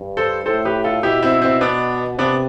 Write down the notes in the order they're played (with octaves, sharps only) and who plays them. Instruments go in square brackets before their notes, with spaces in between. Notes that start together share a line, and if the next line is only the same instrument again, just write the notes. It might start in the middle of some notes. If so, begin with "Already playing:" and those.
Already playing: [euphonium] G2
[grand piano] A4 C5
[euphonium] A2 [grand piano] A4 C5
[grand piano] G4 B4
F4 A4
[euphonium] B2 [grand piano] E4 G4
[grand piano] C4 E4
C4 E4
B3 D4
[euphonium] C3 [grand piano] B3 D4